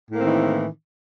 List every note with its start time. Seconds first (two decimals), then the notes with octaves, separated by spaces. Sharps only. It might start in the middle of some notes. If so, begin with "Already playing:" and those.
0.10 A2
0.14 A#3
0.18 C4
0.22 D#3
0.26 E3